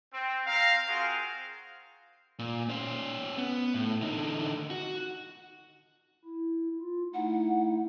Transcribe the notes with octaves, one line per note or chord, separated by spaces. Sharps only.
C4
C4 F5 A#5
C4 F4 F#4 G#4 A#4 C5
A#2
C#4 C5
B3
A2
D3 D#4
F#4
E4
F4
A3 D#4 E4 F#5